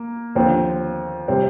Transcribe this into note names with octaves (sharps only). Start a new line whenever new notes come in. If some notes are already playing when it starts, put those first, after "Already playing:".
Already playing: A#3
D#2 D3 F3 C4
C3 G3 C4